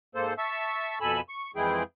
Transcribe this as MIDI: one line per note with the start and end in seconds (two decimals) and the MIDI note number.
0.15 0.34 44
0.15 0.34 58
0.15 0.34 69
0.15 0.34 72
0.38 0.98 76
0.38 0.98 81
0.38 0.98 85
0.38 0.98 88
1.01 1.20 41
1.01 1.20 47
1.01 1.20 69
1.01 1.20 80
1.01 1.20 83
1.01 1.20 88
1.29 1.51 85
1.56 1.83 41
1.56 1.83 52
1.56 1.83 56
1.56 1.83 64
1.56 1.83 68
1.56 1.83 79